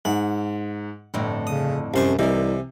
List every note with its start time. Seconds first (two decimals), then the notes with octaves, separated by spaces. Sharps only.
0.05 G#2 F#5
1.14 G1 F2 A2 D3
1.47 C#3 D#6
1.94 C2 F#2 C5 C#6
2.19 C2 C3 E3 D#4 A#4